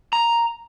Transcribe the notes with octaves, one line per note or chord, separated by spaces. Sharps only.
A#5